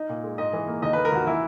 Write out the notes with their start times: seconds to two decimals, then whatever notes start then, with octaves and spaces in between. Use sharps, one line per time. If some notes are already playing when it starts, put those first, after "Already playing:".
Already playing: D#4
0.09 A#2
0.23 G#3
0.38 G#2 D#5
0.53 E3
0.67 A#3
0.82 D#2 D#5
0.93 B4
0.97 A#3
1.05 A#4
1.12 D#2 F#4
1.27 E3 E4